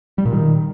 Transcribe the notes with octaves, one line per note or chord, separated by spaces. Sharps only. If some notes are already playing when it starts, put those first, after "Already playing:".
G3
A#2
D#3